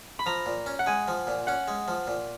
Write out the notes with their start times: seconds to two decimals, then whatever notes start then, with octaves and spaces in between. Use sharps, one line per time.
0.19 B5
0.26 F3 A#5
0.46 A#2
0.66 C#4
0.79 F#5
0.86 G#3 G#5
1.08 F3
1.27 A#2
1.47 C#4 F#5
1.68 G#3
1.88 F3
2.07 A#2